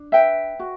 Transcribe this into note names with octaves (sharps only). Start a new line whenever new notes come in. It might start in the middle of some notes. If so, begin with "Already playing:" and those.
Already playing: D4
B4 E5 G5
F#4